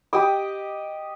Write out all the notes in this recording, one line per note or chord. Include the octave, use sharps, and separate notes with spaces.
G4 D#5 D6